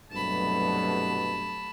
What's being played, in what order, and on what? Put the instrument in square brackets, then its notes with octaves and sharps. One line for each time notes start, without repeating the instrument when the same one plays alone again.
[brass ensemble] C2 G2 B2 [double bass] F#3 A3 [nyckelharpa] A5 B5